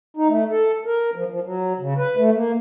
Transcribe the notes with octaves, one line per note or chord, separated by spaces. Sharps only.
D#4
A3
A4
A#4
F3
F3
F#3
C#3
B4
A3
A#3